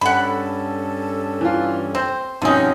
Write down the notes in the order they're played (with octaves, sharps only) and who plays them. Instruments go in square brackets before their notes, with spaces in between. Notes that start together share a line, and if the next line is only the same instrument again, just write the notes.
[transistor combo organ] G2 C#4 [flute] A4 [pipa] F#5 B5
[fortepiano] E3 F4
[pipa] C4 [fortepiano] C5
[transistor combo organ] G2 B2 F3 [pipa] D3 G#4 [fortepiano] C4 C#4 [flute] D#4